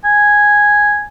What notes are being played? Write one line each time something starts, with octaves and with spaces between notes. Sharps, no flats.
G#5